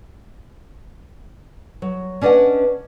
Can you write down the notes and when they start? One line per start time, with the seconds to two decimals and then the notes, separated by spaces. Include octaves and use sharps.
1.82 F#3
2.21 C#4 D4 B4 D5 D#5 F#5